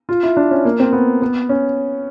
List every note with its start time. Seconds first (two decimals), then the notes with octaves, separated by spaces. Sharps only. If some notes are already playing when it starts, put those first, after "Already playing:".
0.09 F4
0.23 E4
0.37 D4
0.51 C#4
0.65 A#3
0.80 C4
0.93 B3
1.22 B3
1.49 C#4